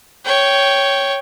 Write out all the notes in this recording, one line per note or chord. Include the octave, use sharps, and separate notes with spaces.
C#5 G5